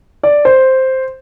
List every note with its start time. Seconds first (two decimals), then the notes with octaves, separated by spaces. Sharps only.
0.23 D5
0.45 C5